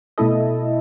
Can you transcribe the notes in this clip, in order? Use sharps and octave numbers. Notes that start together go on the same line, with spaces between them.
B2 A3 E4 A4 D#5